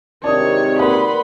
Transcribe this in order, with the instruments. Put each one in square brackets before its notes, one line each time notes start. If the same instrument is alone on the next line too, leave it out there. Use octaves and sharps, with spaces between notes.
[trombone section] G#1 C3 D#3 [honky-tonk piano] D4 D5 [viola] C#5 [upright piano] A5 D#6
[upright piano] A#3 D5 F#5 [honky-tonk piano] B4 [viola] B5 C6